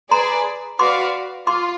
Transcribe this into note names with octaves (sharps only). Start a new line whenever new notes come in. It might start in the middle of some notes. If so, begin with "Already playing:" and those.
G#4 B4 D5 A#5 C6
F#4 B4 D5 F5 C6 D6
F4 C6 D6